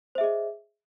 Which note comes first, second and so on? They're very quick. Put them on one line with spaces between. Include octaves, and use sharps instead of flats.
C5 E5 G#4 D#5